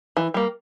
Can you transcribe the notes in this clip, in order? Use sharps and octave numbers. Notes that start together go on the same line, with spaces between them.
E3
G3 A#3